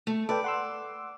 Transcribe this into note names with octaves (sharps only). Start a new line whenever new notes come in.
A3
A4 B4 D5 G5
F#5 C6 E6